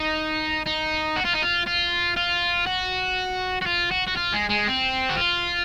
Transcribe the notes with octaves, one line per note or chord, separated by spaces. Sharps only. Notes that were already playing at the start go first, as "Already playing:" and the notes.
Already playing: D#4
D#4
F#4
F4
D#4
F4
F4
F4
F#4
F#4
F4
F#4
F#4
F4
G#3
G#3
C4
F#4
F4